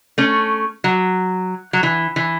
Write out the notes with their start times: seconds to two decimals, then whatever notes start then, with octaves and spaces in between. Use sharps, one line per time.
0.18 A3 C#4
0.84 F#3
1.73 F#3
1.83 E3
2.16 E3